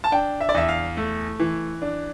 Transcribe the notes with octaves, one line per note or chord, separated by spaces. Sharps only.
A5
D4 G5
E5
D5
E2 E5
F5
A3
E3
D4